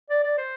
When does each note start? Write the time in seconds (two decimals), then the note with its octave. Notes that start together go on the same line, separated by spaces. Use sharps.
0.10 D5
0.24 D5
0.38 C5